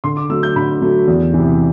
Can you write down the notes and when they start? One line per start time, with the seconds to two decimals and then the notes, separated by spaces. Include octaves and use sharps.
0.04 D3 C6
0.17 D6
0.30 F#3 A3 E6
0.43 G6
0.56 D3 B5
0.82 F#3 A3
1.08 E2
1.34 C3 E3